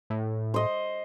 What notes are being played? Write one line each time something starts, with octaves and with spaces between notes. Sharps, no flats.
A2
C5 D#5